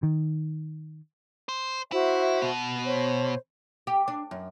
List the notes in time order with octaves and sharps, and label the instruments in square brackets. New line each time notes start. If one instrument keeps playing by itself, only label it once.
[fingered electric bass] D#3
[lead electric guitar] C5
[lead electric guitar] E4 [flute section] F#4 C5 E5
[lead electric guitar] B2
[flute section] C5 C#5
[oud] G4
D4
F#2